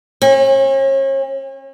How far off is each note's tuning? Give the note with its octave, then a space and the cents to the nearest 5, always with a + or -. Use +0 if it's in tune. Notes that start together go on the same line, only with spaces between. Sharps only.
C#4 -40